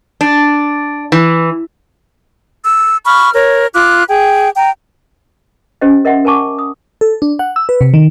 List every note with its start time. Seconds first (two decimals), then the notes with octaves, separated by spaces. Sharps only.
0.21 D4
1.12 E3
2.63 E6
3.05 B5 C#6 F6
3.33 A#4 C#5
3.74 F4 D6 F#6
4.08 G#4 G5
4.56 G5 A#5
5.81 C#4 G4 C5 D#5
6.05 A#4 D#5 E5 F#5 C6
6.25 A#4 G#5 A5 C#6 D6
6.59 D#6
7.01 A4
7.22 D4
7.39 F#5
7.56 E6
7.69 B4
7.81 C3
7.94 D#3